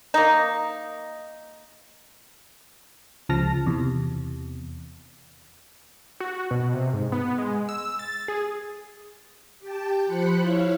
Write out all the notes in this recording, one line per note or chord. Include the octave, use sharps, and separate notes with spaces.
A#3 D#4
C#2 C#3 F3 A5 F6 A#6
E2 C3
F#4
B2
C3
G#2
B3
G#3
E6
A6
G#4
G4 G5 A5
F3 C5 B5 F#6 C#7
E4 C#5 F5